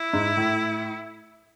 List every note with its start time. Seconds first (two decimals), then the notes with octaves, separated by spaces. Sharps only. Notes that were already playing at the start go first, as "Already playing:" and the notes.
Already playing: E4
0.13 G#2
0.37 A2